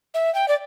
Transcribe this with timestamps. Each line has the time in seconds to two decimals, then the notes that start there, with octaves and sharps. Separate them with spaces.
0.14 E5
0.35 G5
0.48 D5